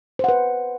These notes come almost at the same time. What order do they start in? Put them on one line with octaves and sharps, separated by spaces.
C5 F#5 B4